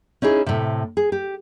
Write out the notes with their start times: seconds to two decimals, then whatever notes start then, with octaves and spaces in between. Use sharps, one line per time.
0.22 C#4 D#4 E4 G#4
0.46 A2 C3
0.97 G#4
1.12 G4